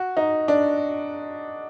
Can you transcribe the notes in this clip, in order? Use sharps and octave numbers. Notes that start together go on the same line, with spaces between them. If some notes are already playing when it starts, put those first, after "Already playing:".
Already playing: F#4
D#4
D4